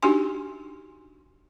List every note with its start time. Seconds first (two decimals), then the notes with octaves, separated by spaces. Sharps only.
0.02 D4 D#4 F#4 G4 G#5 C6